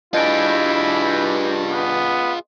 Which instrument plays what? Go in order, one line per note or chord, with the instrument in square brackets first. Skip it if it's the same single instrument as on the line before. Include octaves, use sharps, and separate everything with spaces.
[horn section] G2 [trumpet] E4 [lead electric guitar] F4 G#4 [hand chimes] D#5 D7
[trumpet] B3